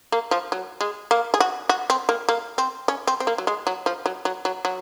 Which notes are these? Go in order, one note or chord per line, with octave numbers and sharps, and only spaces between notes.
A#3
F3
F#3
G#3
A#3
G#4
F#4
F#4
C4
A#3
A#3
C4
C#4
C4
C4
A#3
F#3
G#3
F#3
F3
F#3
F#3
F#3
F#3